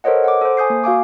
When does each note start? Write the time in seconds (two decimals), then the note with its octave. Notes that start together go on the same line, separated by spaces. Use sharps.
0.04 A4 A#4 C5 C#5 D#5 F#5
0.24 F#5 D6
0.41 A4 C5
0.57 G#5 D#6 G6 C7
0.70 A#3
0.84 F#4 F5 G#5 D6